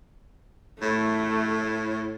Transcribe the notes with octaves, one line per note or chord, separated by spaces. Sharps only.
A2 A3